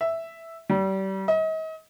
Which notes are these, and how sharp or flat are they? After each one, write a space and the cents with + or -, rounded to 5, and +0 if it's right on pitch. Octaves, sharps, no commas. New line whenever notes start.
E5 +0
G3 -30
D#5 +40